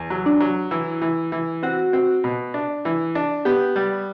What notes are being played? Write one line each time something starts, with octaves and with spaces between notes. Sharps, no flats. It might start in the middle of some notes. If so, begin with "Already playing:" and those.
Already playing: E2
F#3
D4
F#3
E3 E4
E3
E3
C4 F#4
C4
B2
D4
E3
D4
B3 G4
G3